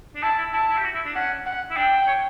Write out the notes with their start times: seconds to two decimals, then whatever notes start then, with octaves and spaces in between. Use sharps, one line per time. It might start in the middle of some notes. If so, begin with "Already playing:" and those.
0.16 D4
0.23 E4 A5
0.38 E4
0.53 E4 A5
0.69 E4
0.78 G4
0.85 F#4
0.95 E4
1.05 D4
1.15 C#4 F#5
1.46 F#5
1.71 E4
1.77 D4 G5
2.07 C#5